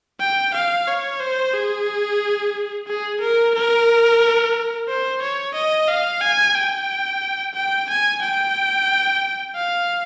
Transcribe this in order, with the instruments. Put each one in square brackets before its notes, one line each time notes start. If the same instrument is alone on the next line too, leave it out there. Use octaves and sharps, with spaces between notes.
[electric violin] G5
F5
C#5
C5
G#4
G#4
A#4
A#4
C5
C#5
D#5
F5
G#5
G5
G5
G#5
G5
F5